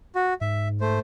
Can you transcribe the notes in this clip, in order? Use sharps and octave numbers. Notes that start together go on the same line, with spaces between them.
F#4
G#2 E5
A3 C5